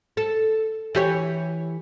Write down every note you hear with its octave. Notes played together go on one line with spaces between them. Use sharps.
A4
E3 G4 C#5